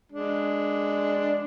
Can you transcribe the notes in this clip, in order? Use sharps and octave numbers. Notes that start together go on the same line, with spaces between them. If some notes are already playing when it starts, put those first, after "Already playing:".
G#3 D4